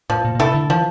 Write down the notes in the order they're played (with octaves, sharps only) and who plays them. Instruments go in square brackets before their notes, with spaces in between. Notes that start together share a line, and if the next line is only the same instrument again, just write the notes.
[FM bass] A2 [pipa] F3
[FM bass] A#2
A#2
[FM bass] C3 [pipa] A3 E4 A4
[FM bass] D3
[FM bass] E3 [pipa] F3